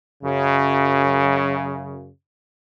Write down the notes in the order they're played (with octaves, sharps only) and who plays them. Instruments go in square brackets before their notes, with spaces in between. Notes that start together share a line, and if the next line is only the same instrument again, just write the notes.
[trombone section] F#2 C#3